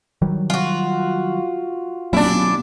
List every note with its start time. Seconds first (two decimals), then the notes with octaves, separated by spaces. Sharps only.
0.22 D#3 F#3 G3
0.50 F4 F#4
2.13 A#1 D#2 B2 F#3 C#4 D4 E4